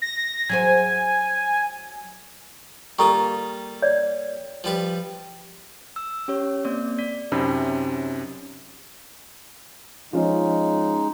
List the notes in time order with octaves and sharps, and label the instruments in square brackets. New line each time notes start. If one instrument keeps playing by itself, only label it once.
[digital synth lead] A#6
[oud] F#3 G#4 C5 [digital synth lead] G#5
[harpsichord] G3 A#3 F4 [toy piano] A4 A#5 C#6
[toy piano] C#5 D5
[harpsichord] F3 G3 B4
[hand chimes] E6
C#4 G4 C#5
A#3 C4 D5
[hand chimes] D5 [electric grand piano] B6
[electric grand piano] F#2 C3 B5 [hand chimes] C#4 D#4
[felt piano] F3 C#4 [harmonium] G#3 D#4